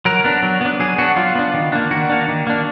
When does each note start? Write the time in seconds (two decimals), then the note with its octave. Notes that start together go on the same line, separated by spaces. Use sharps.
0.05 F#3 A#4
0.24 B3 D4
0.43 F#3
0.61 B3 D4
0.80 F#3 G#4
0.98 B3 D4 F#4
1.16 F#3 F4
1.35 B3 D4
1.54 D#3
1.72 A#3 D4
1.91 D#3 F#4
2.09 A#3 D4
2.28 D#3
2.47 A#3 D4